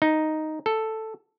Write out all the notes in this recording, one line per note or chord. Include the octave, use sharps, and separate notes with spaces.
D#4
A4